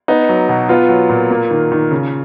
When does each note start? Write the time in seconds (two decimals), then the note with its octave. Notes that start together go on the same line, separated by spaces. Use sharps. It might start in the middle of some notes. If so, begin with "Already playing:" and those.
0.08 B3 D#4
0.29 F#3
0.49 B2
0.69 B3 F4
0.89 F#3
1.09 A#2
1.31 A#3
1.51 D#3
1.72 D#3
1.91 C#3